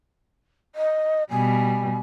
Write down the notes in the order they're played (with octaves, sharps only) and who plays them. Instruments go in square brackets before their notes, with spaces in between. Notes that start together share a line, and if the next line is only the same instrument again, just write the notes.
[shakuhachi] D#5
[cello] B2 G3 [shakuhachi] G#5